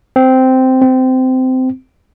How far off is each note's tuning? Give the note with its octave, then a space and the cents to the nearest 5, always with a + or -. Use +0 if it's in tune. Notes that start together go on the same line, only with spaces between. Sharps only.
C4 -10
C4 -20